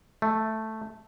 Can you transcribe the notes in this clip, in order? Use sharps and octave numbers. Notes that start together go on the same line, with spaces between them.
A3